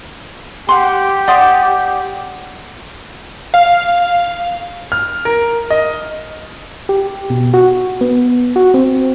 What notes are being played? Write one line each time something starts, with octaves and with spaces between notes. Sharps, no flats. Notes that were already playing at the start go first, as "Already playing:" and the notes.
G4 F#5 C6
D5 F#5 C6 D#6
F5
F6
A#4
D#5
G4
B2
F#4
B3
F#4
C4